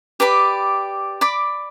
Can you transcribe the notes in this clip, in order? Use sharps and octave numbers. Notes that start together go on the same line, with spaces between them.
G4 B4 D5 B5
D5 B5 D6